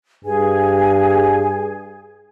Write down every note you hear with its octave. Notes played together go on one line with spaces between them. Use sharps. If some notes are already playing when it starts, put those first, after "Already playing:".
G2 G#4 G#5